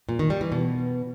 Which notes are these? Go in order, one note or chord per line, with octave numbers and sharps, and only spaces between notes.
A#2
D#3
G3
E3
B2